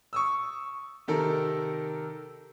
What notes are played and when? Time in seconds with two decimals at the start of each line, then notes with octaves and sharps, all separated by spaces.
0.13 C#6 D#6 E6
1.08 C3 D#3 A4 A#4